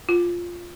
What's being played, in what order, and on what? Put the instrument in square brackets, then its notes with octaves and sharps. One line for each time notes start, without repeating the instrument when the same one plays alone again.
[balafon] F4